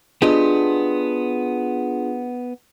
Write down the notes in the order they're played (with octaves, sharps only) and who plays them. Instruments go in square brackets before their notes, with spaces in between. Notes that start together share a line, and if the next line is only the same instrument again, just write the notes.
[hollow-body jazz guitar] B3 G4 D#5 [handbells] D4 F4 G#4